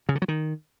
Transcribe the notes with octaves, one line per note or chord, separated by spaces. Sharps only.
C#3
D3
F#3
D#3